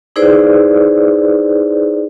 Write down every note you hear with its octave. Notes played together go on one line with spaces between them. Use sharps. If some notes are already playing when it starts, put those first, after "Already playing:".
D#4 E4 G#4 B4 C5 D5